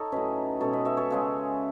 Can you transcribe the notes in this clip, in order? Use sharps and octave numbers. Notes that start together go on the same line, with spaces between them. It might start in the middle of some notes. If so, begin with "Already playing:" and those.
Already playing: D#4 A4 C#5
A2 F#3 C#4 B4 D#5
B2 G#3 C#4 A4 C#5
B4 D#5
C#5 E5
A4 C#5
C#3 G#3 C#4